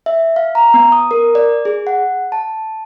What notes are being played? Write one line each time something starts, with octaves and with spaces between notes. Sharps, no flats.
E5
F5
A#5
B3
D#6
A#4
D5
G#4
F#5
A5